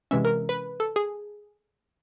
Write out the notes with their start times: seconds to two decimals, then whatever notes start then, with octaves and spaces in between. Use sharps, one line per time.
0.11 C3 E3 G#3 C#4 E5
0.25 A#4
0.49 B4
0.80 A4
0.96 G#4